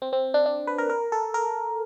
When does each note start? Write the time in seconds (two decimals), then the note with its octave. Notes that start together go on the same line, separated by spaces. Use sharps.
0.02 C4
0.13 C4
0.34 D4
0.46 D4
0.67 B4
0.78 A#4
0.89 A#4
1.12 A4
1.34 A#4